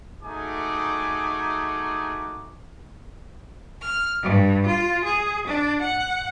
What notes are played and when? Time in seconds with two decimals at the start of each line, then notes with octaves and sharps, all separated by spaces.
0.23 A3 D#4 F#4 G#4 G#5 D6
3.81 F6
4.22 G2
4.65 F4
5.04 G#4
5.47 D4
5.81 F#5